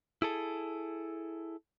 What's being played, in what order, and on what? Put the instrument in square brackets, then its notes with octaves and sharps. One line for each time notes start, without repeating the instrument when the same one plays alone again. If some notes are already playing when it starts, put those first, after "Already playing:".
[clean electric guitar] E4 G#4 A4